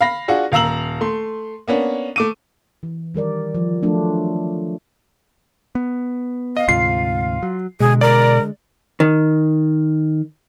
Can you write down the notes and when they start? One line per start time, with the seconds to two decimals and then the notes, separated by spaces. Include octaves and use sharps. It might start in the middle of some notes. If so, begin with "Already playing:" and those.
0.01 F5 B5 A#6
0.28 D4 F4 F#4 G#4
0.52 D#1 F5 A#5 E6 F#7
1.01 A3 C6
1.68 A#3 B3 C#4 D4
2.16 A3 D6 D#7
2.83 E3
3.14 D#3 G3 A#4 D5
3.55 F3
3.82 F3 F#3 A3 D4 F4
5.75 B3
6.57 D#5 F5
6.68 D2 G#2 C3 F4 C7
7.43 F#3
7.80 B2 D3 G#3 G#4
8.01 A#4 D5
9.00 D#3